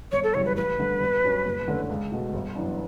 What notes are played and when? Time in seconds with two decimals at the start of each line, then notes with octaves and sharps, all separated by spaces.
0.12 G1 C#5
0.24 A4
0.34 F#2 C#3 E3 G3 C#5
0.46 B4
0.56 A1 B4
0.79 G2 D3 A3
1.01 G1
1.23 G2 F#3 C#4
1.45 F#1
1.67 E2 D3 A3 C#4
1.89 C#2
2.11 B2 A3
2.34 G1
2.56 F#2 E3 B3 D4